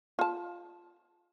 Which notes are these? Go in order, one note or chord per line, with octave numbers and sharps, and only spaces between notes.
F4 A5